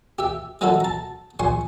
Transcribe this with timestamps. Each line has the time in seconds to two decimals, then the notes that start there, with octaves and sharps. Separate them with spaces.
0.19 G4 E5
0.61 E3 F#3 D#4 E4 F#4 A4
0.80 A5 A#5
1.39 A#1 G#5 C6 C#6